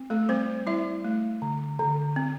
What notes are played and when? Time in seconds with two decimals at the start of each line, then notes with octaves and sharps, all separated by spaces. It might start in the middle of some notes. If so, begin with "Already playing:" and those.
Already playing: C4
0.10 A3 A4
0.29 G3 C4 C5
0.66 G3 E4 E5
1.04 A3
1.42 D3
1.79 D3
2.16 C4